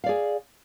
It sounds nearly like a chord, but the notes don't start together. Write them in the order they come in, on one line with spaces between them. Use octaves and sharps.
F5 D5 G#4